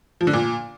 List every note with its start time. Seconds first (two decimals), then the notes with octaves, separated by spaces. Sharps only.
0.21 F3
0.27 D3
0.33 A#2